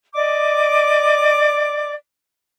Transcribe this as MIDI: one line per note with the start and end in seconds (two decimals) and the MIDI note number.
0.14 1.93 74
0.14 1.93 75
0.14 1.93 86